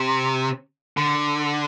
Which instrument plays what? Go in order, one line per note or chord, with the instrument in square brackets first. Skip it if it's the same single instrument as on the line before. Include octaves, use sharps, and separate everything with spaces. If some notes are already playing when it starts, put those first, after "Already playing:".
Already playing: [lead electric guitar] C3
D3